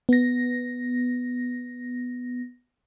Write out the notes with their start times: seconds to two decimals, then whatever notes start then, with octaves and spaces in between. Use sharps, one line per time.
0.09 B3 A#6